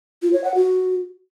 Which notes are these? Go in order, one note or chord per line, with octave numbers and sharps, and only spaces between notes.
F4
C#5
F#5
F#4